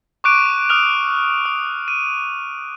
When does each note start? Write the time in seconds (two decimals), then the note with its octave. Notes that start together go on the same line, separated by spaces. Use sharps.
0.24 C#6 D6 F#6 D7 D#7
0.69 D#6 F6 F7
1.45 D#6
1.88 D#7